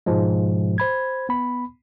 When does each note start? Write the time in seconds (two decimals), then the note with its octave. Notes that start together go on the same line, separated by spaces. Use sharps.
0.06 G#2 B2 F3 G#3
0.78 C5 B5 G#6
1.29 B3 B5